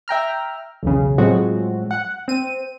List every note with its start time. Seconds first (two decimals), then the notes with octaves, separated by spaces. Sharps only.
0.08 E5 G5 A#5 F6
0.83 B1 E2 C#3
1.18 A2 F3 F#3 G#3 C4 F#4
1.91 F#5
2.28 C4 D#7